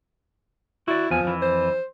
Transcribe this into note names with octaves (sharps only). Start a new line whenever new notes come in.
E4 F#4 D5
E2 F3 G#5
F2 E3
C5